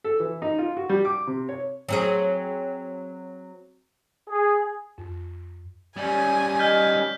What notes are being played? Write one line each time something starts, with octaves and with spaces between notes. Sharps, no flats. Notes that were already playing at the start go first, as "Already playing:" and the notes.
A4
E3
D#4
F4
F#4
G3
D6
C3
C#5
F#3 C4 G#4
G#4
F2
G3 C#4 G#5
D#5 F6 G6 B6